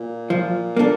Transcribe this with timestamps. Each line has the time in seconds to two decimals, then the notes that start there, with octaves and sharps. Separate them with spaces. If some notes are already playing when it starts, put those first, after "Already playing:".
Already playing: A#2
0.30 F3
0.77 A#3 D4 A4